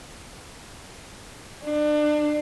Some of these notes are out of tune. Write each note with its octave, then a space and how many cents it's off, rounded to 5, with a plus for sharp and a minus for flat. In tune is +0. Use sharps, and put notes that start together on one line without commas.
D4 +30